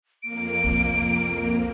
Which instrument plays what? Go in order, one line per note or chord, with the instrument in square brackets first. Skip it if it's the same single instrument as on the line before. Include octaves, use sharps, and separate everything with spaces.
[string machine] F2 A#3 [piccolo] D7
[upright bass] C2